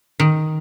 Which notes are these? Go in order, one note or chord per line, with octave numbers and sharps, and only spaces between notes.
D#3